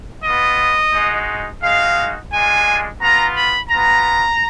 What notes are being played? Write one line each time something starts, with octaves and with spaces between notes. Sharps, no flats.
B3 F4 D#5
G#3 D#4 F#4
G#3 D#4 F#4 F5
G#3 D4 F4 G#5
B3 F4 A#5
B5
B3 F4 A#5